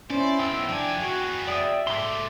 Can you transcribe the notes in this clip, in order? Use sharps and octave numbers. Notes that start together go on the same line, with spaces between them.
C#4 E4 C5 D5
B1 G5 E6
F3 D4 G5 G#5
B3 F#4 G#4
D5 E5 G5 D#6
G#2 A3 C6 D6